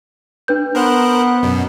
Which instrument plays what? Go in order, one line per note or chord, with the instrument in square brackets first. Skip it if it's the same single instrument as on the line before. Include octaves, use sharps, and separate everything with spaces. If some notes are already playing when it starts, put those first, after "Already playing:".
[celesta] D4 B4 G6
[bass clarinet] B3 [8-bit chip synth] A#4 C5 F#6
[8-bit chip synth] F#2 B2